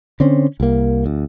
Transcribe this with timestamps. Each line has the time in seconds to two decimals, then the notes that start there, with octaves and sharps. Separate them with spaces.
0.20 D3 C4 C#4
0.60 C2 A#3
1.06 D2